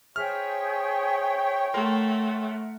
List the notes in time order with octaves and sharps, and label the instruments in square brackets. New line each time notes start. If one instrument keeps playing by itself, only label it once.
[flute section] G#4 C5 E5 [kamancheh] C#5 G5 [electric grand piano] F6
[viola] A3 [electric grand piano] A#4 C6 [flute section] E5 F#5